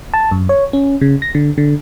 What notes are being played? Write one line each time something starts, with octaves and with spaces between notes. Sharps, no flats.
A5
F#2
C#5
C#4
C#3
A#6
D3
D3